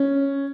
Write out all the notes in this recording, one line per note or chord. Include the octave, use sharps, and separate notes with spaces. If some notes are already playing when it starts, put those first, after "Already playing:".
Already playing: C#4